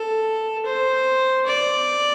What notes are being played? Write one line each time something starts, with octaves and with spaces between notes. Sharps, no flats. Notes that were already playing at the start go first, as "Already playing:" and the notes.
Already playing: A4
C5
D5